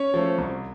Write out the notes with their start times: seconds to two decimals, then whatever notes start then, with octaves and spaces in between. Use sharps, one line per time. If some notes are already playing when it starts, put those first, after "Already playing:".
Already playing: C#4 C#5
0.14 F3 A3
0.38 C2